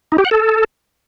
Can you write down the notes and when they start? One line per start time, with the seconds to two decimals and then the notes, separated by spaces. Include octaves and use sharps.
0.12 D#4
0.18 G4
0.25 F#5
0.31 A4